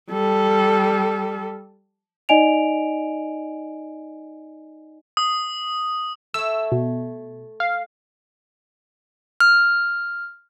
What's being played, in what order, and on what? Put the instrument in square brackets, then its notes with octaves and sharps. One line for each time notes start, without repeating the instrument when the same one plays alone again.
[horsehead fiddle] G3 A4
[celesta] D#4 D5 D#5 G#5 D7 F7
[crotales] D#6
[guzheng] A3 C#5 [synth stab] E6
[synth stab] B2
F5
[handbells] F6